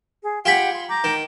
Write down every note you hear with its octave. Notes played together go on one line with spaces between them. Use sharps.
G#4
F4 G4 G#4 F#5 G5 B5
C6
A#5 D6 G6
D#3